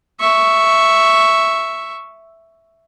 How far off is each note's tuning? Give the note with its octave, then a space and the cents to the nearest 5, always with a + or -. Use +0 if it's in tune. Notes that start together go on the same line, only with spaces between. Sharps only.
E5 +0 C#6 +0